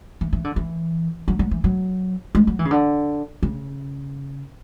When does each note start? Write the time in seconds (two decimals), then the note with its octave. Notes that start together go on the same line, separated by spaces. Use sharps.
0.21 E3
0.33 E3
0.44 D3
0.56 E3
1.28 F#3
1.39 F#3
1.51 E3
1.64 F#3
2.35 G#3
2.47 F#3
2.59 E3
2.65 C#3
2.71 D3
3.43 C#3